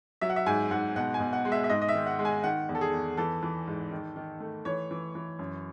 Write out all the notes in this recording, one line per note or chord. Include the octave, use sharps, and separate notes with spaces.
F#3 E5
F#5
E5
G#2 G#5
G#2 F#5
B2 F#5
G#5
B2
F#5
G#3
E5
E5
G#2 D#5
D#5
E5
D#3
F#5
G#3
G#5
D#3 F#5
E2
A4
G#4
E2
E3 A4
E3
G#2
D#3
D#3
A3
E3 C#5
E3
E3
F#2